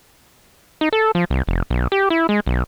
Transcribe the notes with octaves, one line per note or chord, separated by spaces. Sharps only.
D#4
A4
F3
C2
F1
B1
G4
E4
G#3
B1